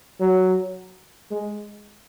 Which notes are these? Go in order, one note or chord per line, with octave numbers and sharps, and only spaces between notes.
F#3
G#3